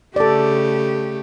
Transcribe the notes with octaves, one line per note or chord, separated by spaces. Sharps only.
C#3 A3 G4 A4 D5